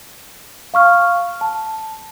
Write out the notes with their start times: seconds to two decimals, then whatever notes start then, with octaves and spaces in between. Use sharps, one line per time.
0.74 F5 C#6 F6
1.41 A5